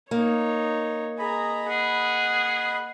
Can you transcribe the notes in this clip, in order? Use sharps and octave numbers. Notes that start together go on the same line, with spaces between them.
A#3 D#4 C#5
G#4 D#5 A#5 B5
G#4 F#5